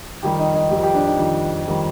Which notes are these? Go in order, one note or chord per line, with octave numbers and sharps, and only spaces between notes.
F2 D#3 G3 G4
D#4
D#4
F2 D#3 G3 G4
G4
D4
D#4
F2 D#3 G3
F2 D#3 G3